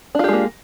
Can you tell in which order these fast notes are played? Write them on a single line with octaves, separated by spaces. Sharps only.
D4 F4 G4 G#3 A#3